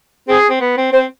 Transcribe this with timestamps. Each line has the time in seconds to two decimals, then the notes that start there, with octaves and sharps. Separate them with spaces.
0.28 C4 G#4
0.49 C4
0.61 B3
0.77 C4
0.92 C4 C5